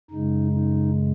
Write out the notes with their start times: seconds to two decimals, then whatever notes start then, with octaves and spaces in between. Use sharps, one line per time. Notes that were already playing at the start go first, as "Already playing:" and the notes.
0.11 F#2 C#3 G#3 D#4
0.53 D#4